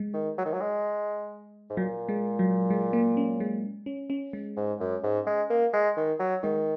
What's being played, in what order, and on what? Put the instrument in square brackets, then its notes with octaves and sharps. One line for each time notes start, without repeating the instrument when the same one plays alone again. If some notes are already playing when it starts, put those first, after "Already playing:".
Already playing: [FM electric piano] G#3
[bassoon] D#3
F#3
D#3
F#3
G#3
G#2
[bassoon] A#2 [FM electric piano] F#3
[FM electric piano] G#3
F#3
G#3
A#3
C#4
G#3
C#4
C#4
G#3
[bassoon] G#2
F#2
G#2
G#3
A#3
G#3
D#3
F#3
[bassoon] D#3 [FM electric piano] G#3